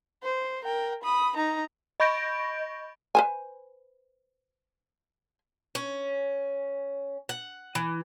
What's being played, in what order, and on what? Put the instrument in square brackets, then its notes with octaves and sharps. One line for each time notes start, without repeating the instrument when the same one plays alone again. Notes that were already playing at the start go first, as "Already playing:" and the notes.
[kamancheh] C5
A#4 G5
B5 D#6
D#4 A#5
[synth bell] D#5 B5 C#6 G6 A#6 D7
[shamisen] B4 C5 G#5
[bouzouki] C#4
F#5
E3